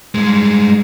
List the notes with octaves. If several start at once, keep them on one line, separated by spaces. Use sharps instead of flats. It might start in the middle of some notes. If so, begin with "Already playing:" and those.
G2 G#3